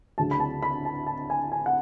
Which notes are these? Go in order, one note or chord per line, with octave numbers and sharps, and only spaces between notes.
D2 C#3 F#3 A5
B5
A5
B5
A5
A5
G#5
G#5
F#5